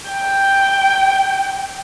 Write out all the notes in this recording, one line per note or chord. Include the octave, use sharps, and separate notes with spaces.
G5